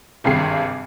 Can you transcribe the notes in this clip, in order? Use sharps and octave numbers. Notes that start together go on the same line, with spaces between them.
G#1 G2 C3 G#4 C7